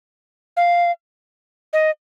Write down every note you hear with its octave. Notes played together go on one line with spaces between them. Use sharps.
F5
D#5